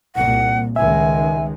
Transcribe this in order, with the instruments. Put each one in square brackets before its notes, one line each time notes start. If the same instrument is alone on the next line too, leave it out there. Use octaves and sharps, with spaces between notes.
[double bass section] C2 A#2 [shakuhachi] F#5
[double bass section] C#2 D#3 G#3 [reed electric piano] E5 [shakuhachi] G#5